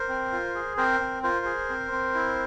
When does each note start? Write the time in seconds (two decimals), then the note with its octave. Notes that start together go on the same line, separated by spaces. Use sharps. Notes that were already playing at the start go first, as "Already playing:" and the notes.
Already playing: A#4 C5
0.08 C4
0.32 F4
0.55 G#4
0.77 C4 A#4 C5
1.00 C4
1.23 F4 A#4 C5
1.45 G#4
1.69 C4
1.92 C4
2.15 E4